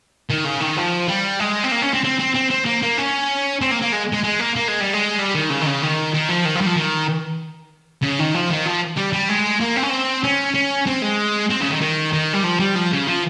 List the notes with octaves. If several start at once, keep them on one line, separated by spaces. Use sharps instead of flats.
D#3
C#3
D#3
F3
G3
G#3
C4
A#3
C#4
C4
C4
C4
C4
C4
A#3
A#3
C#4
C4
A#3
A#3
G#3
G#3
G#3
A#3
A#3
G#3
G3
G#3
G3
D#3
C#3
D#3
C#3
D#3
D#3
F3
D#3
F3
G3
F3
D#3
C#3
D#3
F3
D#3
F3
G3
G3
G#3
A#3
C4
C#4
C4
C#4
C#4
C4
G#3
C4
C#3
D#3
D#3
D#3
G3
F3
G3
F3
C#3
F3